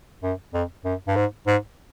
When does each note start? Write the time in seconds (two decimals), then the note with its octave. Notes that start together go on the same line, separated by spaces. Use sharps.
0.23 F#2
0.54 F2
0.85 F#2
1.07 G2
1.16 G#2
1.47 G#2